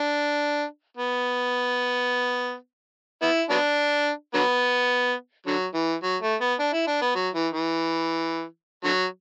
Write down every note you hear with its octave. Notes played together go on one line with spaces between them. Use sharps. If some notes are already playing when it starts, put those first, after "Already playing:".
Already playing: D4
B3
B3 E4
F#3 B3 D4
D3 F#3 B3
D3 F#3
E3
F#3
A3
B3
D4
E4
D4
B3
F#3
E3
E3
D3 F#3